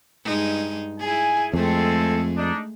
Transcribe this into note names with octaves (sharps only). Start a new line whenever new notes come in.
G2 G#3 D#4
E4 G#4 G#5
F2 G#3 A3 C4 G#4 A4
D4 D#4